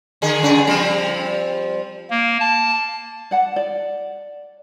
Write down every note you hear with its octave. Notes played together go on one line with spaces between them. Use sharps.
D3 G#4
G2 C#3 G#4
F3 G3 C4
A#3
A5
D5 F#5 A5
D5